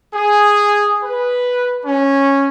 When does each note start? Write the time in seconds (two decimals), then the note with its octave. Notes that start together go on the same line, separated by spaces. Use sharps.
0.13 G#4
1.02 B4
1.84 C#4